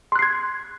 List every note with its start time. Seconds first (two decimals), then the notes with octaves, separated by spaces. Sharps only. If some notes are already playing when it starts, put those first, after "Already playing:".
0.12 C6
0.16 F#6
0.19 C7
0.22 G#6